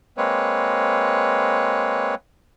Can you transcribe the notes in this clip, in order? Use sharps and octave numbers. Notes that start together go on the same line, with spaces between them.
G#3 A#3 C4 B4 C#5